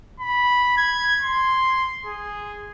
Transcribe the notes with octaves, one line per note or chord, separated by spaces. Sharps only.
B5
G#6
C6
G#4